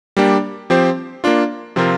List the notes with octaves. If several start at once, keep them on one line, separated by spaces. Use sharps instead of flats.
G3 A#3 D4 G4 D5
F3 C4 G4 C5
A#3 D4 F4
C3 F3 C4 F4 A#4